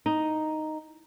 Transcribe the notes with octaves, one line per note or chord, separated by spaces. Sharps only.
D#4